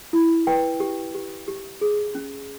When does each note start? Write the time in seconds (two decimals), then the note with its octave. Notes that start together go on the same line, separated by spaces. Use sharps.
0.13 E4
0.47 B4 G5
0.80 G4
1.15 G4
1.48 G4
1.81 G#4
2.15 C#4